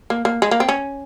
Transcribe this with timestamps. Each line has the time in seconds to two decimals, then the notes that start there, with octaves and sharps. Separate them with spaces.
0.10 A#3
0.25 A#3
0.42 G#3
0.51 A#3
0.60 C4
0.69 C#4